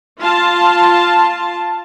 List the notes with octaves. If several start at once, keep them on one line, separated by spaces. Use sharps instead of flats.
F4 A5